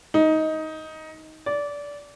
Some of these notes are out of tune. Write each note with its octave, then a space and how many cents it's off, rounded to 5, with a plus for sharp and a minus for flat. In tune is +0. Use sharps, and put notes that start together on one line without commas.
D#4 +15
D5 -20